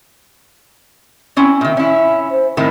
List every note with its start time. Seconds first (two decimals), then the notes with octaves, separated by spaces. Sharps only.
1.37 C4 C#4 E4
1.61 A#2 D#3 E5
1.77 C#4 E4
2.31 C5
2.57 A2 D#3 C4 E4